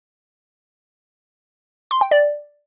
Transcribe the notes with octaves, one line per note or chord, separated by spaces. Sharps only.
C6
G5
D5